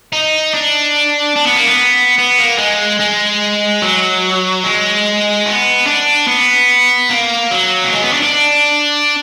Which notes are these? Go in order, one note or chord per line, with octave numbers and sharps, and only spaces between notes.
D#4
D4
D4
B3
A#3
B3
B3
A#3
G#3
G#3
F#3
G#3
B3
D4
B3
A#3
F#3
A#3
G#3
B3
D4
D4